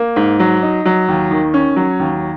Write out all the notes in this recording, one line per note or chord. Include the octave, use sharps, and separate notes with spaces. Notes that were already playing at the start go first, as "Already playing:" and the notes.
Already playing: A#3
G#2
F#3
D#4
F#3
D#2
D#3
C#4
F#3
D#2